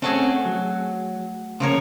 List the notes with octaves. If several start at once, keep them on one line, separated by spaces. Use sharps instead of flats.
A3 C4 C#4 F#4 G#4 A4
F#3
C#3 F3 A#3 A#4 C#5